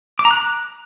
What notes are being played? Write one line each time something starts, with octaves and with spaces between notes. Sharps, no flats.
D6
A#5
F#6